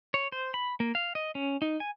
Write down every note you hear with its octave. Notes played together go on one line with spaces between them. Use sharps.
C#5
C5
B5
A#3
F5
D#5
C#4
D#4
G#5